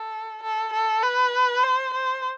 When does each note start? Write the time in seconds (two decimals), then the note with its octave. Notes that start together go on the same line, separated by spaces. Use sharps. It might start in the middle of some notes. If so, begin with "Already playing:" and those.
Already playing: A4
0.43 A4
0.73 A4
1.03 B4
1.63 C5
1.94 C5